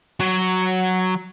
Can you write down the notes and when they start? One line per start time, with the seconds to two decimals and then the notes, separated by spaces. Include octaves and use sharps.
0.20 F#3